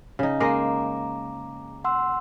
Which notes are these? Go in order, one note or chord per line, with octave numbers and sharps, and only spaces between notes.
C#3 D#4
G#3 A#3 D#5 A#5 D6
F#5 C6 E6